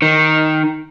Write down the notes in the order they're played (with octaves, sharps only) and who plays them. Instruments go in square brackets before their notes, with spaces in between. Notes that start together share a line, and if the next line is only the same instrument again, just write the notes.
[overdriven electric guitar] D#3